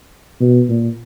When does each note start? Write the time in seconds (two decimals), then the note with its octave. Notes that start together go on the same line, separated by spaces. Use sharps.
0.40 B2
0.69 A#2